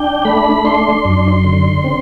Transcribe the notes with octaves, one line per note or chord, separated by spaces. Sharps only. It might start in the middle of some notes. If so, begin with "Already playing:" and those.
Already playing: D4 G5
A3 B5
D4 C6
F#2
D3
C4